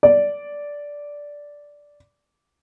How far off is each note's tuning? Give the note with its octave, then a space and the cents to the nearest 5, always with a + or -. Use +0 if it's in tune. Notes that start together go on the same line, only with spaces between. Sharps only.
D5 -10